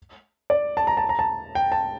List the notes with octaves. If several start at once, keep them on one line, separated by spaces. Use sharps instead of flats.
D5
A5
A#5
A5
A#5
A5
G5
A5